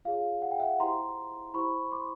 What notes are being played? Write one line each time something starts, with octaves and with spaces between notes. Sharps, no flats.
F4 G#4 C#5 F5
F#5
G5
E5 F#5
E4 G4 C5 A#5 C6
E4 G4 C5 B5 C#6
C6 D6